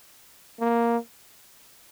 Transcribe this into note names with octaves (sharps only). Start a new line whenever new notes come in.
A#3